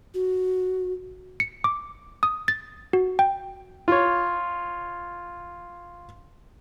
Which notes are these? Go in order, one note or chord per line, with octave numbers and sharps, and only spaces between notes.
F#4
C#7
D6
D#6
A6
F#4
G5
F4 C#5